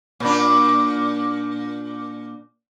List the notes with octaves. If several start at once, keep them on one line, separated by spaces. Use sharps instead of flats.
A#2 D4